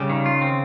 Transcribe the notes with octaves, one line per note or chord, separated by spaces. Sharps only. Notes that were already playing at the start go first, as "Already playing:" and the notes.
Already playing: C#3 G3
D#3
F4
C4